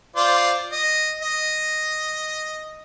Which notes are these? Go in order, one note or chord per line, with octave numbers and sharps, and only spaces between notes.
F4 C5 D5
D#5
D#5